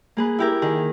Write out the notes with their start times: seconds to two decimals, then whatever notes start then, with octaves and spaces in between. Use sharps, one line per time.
0.17 A#3 G#4 B4
0.38 E4 G4 A#4
0.62 D#3 G#4